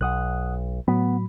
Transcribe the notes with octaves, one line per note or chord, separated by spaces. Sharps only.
B1 F#5 D#6 F#6
A2 F#3 B3 B5